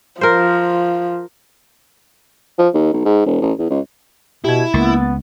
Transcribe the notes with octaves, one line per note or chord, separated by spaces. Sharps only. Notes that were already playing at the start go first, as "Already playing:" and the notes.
F3 A#4 C5
F3
D#2
B1
G#2
E1
A1
E2
C#2
B2 E4 G4 G#6
C#2 A#3 B3 A6